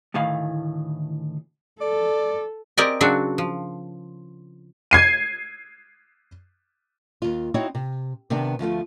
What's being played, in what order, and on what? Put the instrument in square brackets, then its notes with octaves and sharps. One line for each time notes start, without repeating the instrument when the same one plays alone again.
[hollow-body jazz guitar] D2 A2 D#3 E3 F5
[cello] A4 [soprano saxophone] D5
[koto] C4 G4 A#4 D5 D#5 G#5
C#3 F#3 C4 D4 F#4
F3
[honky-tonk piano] G#6 C7 D#7
[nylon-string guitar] D#2 F4
C4 D#4 E4 F#4 C#5
C3
C3 D#3 B3 D4
D2 F3 A3 F4